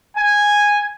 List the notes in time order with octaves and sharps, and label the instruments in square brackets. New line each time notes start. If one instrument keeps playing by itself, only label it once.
[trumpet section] G#5